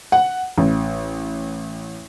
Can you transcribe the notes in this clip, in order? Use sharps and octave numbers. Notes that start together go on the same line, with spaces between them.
F#5
A1